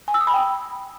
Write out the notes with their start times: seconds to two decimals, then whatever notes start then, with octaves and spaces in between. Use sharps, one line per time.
0.08 G#5
0.14 E6
0.21 D#6
0.27 B5
0.34 G5